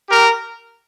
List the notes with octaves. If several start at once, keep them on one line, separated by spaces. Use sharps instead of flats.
G4 A#4